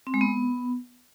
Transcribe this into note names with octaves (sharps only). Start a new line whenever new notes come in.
C4
G#3
B3